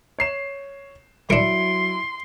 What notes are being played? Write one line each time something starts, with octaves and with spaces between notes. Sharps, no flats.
C#5 C7 E7
F#3 D4 E4 A#4 C6 C#7 D7